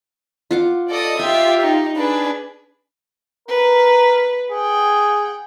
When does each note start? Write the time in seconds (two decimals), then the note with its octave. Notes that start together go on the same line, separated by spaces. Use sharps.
0.51 F4 F#5 D6
0.90 A4 D5 D#5 D#6
1.19 F4 G4 E5 G5
1.61 D#4
1.97 D4 G#4 B4
3.48 A#4 B4
4.52 G#4 F#5 G5